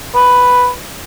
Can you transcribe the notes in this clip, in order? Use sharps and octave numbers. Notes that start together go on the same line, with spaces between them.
B4